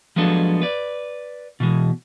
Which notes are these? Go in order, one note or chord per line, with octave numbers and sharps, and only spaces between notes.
F3 F#3 G#3 B3 D4 A4
B4 D5
B2 E3 G#3